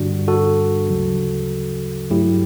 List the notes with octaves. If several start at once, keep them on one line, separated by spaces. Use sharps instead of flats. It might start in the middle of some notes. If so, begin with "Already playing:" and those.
Already playing: G2 D3 G3 D4 F#4
F#4 A4
D2 C#3 F#3
G2 F#3 A3 E4 G4